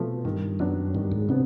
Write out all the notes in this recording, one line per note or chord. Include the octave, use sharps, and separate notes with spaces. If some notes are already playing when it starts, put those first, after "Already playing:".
Already playing: B2 F3 A3
G2 D#3
F#2 F#3 B3 D4
G2 D#3
G#2
C3 B3 D4